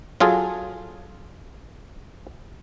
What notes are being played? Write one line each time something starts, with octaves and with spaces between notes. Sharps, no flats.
F#3 F4 G#4 A4